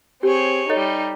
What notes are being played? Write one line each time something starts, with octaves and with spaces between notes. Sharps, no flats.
C4 G4 G#4 C#5
G3 D#4 A4 C#5 D#5